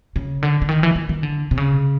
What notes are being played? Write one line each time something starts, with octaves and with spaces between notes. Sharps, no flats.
C#3
D3
D3
D#3
E3
D#3
D#3
D3
C3
C#3